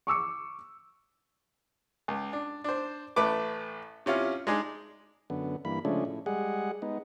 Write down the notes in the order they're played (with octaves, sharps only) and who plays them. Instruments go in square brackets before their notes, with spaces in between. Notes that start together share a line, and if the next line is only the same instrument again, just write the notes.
[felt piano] C#6 D6 E6 C#7
[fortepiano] C#2
D4
D4 C5
A1 A3 B4 D6
C3 C#4 E4 F4
G#3 D4 D#4 G#4
[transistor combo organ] F#2 D3 B3
G2 E3 A#3 B5
C#3 F3 G#3 A3 C#4 D4
A2
G3 G#3 G#4 F#5
G#3 B3 D#4